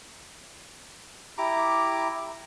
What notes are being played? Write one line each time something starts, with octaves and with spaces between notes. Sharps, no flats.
E4 G4 A#5 D6